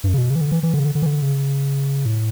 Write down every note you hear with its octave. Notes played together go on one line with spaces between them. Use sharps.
G2
F#2
C#3
B2
C#3
E3
D3
E3
E3
D3
C#3
D3
D3
E3
D3
C#3
A2